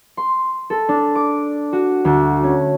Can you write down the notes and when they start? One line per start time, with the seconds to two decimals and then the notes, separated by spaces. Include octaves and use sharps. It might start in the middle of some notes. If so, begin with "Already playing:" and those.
0.17 C6
0.70 A4
0.89 D4
1.15 D6
1.73 F#4
2.05 D2
2.43 C#4